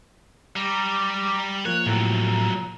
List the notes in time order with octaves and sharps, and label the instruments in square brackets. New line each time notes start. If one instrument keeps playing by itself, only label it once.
[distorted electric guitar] G3 [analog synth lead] A#5 [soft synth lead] D6
[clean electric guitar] F3 A#3 A#4 [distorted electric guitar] C#5 [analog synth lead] F#6
[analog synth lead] A2 [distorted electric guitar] C3 F#3 [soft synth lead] A#5